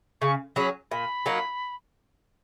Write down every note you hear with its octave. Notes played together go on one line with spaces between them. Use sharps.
C#3 C#6
F#3 C#4 G#4 B5
A#2 B5
F#3 A#3 D#4